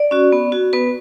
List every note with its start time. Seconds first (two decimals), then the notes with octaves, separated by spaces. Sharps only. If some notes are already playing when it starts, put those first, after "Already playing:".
Already playing: D5
0.11 C#4 F#4
0.32 B3
0.52 F#4
0.73 B3 B4